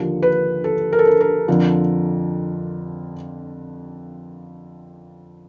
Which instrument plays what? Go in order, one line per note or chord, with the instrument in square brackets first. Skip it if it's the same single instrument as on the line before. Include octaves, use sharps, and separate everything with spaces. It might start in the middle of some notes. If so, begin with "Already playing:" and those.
Already playing: [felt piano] D#2 D3 F3
B4
A4
A#4
A4
A#4
A#4
F2 D3 F3